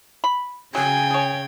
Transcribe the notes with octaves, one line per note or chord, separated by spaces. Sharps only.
B5
C#3 F#3 G5 G#5 G#6
G#4 C#5